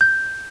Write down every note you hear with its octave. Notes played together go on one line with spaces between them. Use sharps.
G6